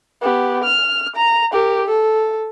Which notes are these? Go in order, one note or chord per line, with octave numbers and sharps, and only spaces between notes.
B3 G4
F6
A#5
G4 A#4
A4